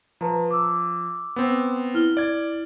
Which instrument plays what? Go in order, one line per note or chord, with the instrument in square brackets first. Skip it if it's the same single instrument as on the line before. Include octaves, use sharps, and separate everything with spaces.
[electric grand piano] F3 [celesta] B4 A5 A#5
[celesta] D6 E6
[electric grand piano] B3 C4
[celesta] E4 F6 G7
[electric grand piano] D5 G#6